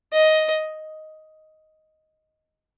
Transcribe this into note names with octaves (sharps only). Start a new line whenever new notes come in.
D#5